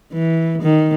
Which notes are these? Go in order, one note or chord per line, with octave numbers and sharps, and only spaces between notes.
E3
D#3